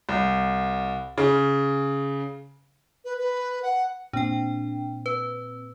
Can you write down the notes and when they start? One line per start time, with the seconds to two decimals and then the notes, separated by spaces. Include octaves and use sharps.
0.09 C2
1.18 C#3
3.05 B4
3.18 B4
3.63 F#5
4.13 A#2 C4 D4 G5
5.06 B4